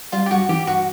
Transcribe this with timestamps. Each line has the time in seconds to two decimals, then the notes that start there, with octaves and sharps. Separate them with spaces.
0.12 G3 F4
0.26 G4
0.31 G2 F#4
0.49 E3 G4
0.67 G2 F#4